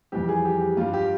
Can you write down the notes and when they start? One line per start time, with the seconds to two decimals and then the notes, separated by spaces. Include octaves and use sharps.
0.12 F2 E3 G3 G4
0.29 G#4
0.45 G4
0.61 G4
0.77 G2 G3 F4
0.93 G4